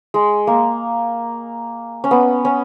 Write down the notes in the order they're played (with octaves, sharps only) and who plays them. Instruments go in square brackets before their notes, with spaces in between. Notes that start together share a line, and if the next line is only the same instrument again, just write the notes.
[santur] G#3
A#3
C#4
B3
C#4